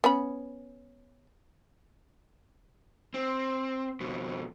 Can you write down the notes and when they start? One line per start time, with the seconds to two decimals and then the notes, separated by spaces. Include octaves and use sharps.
0.04 B3 C#4 B5
3.14 C4
4.01 F2 B2